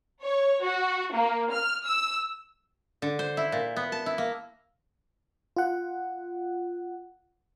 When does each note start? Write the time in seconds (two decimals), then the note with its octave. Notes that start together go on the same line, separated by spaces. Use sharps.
0.23 C#5
0.64 F#4
1.13 A#3
1.51 F6
1.86 E6
3.02 D3
3.19 C5
3.37 E4
3.52 A#2
3.76 B3
3.92 A5
4.06 E4
4.18 A#3
5.56 F4 F#5